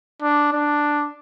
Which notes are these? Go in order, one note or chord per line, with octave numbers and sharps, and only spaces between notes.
D4
D4